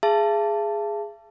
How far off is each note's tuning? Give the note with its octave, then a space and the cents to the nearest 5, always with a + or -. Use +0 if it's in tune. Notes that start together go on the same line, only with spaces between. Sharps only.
G#4 +0 E5 +45 A5 +5